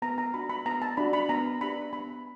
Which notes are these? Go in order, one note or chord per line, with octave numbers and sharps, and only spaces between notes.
B3 A#5
A#5
D4 F#4 B5
B5
B3 A#5
A5
D4 F#4 B5
B5
B3 A#5
D4 G4 B5
B3 B5